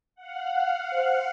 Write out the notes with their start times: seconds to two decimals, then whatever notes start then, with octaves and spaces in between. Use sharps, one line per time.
0.15 F5 F#5
0.94 C5